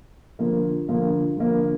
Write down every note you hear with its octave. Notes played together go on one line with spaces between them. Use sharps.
D3 F3 A#3
D3 F3 A#3
D3 F3 A#3